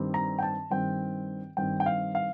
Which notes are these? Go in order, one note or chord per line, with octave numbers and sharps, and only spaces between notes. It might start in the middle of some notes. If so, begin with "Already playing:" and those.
Already playing: G2 D#3 G3 C4
A#5
G5
A5
G2 D#3 G3 C4 G5
G2 D#3 G3 C4 G5
G5
F5
F5